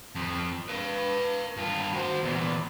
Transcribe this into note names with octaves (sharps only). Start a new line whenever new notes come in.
F2 F3
B4 F5
G2 F4
F#4 C5
E2 A#2